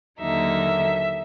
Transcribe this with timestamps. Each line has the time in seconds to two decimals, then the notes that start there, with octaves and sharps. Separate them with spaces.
0.20 D#2 D3 F#3 A#3 D#4 E5